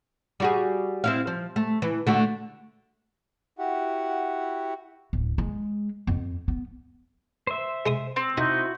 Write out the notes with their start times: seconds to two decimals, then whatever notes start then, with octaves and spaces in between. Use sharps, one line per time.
0.40 G3 F#4 G#4
1.04 C4 E4 F5
1.27 F3
1.56 A3
1.82 E3
2.07 D3 A3 F#4
3.59 E4 F#4 G4 F#5
5.13 D1
5.38 G#3
6.07 F2
6.48 B3
7.47 C5 E5
7.86 G#3 C6 D#6
8.16 C4
8.38 D#4 E4 F#4 D#5